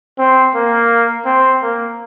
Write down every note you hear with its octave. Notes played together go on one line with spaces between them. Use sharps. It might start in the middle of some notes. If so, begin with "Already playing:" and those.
C4
A#3
C4
A#3